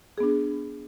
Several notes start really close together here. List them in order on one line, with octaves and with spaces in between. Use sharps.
G#4 B3 D4